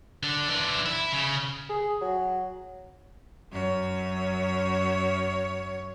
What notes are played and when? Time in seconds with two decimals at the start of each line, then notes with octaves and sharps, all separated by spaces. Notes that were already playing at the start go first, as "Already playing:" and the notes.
0.23 D3 D4
0.49 E3 D4
0.86 E4
1.12 C#3
1.69 G#4
2.01 F#3
3.52 F#2 C#5